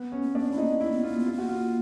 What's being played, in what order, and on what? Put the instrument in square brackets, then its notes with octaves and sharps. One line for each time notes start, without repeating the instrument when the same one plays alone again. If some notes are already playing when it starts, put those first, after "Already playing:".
Already playing: [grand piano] B3
C#4
[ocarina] A#3
[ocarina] B3 [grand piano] D4
[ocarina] A#3 [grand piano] E4
[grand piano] D#4
[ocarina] B3
[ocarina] A#3 [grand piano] E4
[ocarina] B3
[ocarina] A#3 [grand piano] F4
[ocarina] B3
[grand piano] F4
[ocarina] A#3
[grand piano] F#4
F4